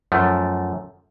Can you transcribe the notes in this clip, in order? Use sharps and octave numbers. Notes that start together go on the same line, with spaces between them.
F#2 F3 A3